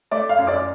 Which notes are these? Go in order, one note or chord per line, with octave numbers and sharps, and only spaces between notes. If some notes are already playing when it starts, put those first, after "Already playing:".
A3 D5 D6
F5 F6
F#2
D5 D6